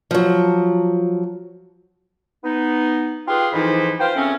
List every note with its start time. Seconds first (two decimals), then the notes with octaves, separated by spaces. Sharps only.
0.11 F3 F#3
2.44 B3 D#4
3.28 F4 G4 G#4 B4 F5 C6
3.53 F2 G#2 E3 F3 D#4 E4
4.00 F4 B4 C5 F5 G5
4.16 C#3 A3 C4 C#4